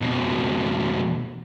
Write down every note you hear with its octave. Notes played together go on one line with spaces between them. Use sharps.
F2 B2